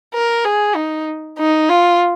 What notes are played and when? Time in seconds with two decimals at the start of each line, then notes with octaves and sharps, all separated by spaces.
0.14 A#4
0.45 G#4
0.76 D#4
1.38 D#4
1.69 F4